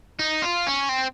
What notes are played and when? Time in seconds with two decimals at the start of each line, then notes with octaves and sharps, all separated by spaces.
0.19 D#4
0.42 F4
0.66 C#4
0.89 C4